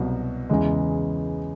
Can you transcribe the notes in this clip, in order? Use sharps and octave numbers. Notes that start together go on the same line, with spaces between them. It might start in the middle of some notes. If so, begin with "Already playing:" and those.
Already playing: C2 B2 F#3
E2 C#3 E3 G#3